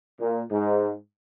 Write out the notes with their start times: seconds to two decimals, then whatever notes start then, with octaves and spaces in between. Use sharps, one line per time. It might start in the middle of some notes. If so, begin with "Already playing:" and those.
0.20 A#2
0.50 G#2